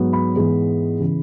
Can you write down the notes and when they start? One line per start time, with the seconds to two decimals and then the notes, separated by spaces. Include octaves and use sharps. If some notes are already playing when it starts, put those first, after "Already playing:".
Already playing: G#2 F#3 B3
0.13 B5
0.35 G#2 E3 G#3 B3
1.00 C#3 E3